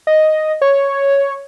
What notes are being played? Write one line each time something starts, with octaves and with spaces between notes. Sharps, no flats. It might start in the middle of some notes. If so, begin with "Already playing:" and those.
D#5
C#5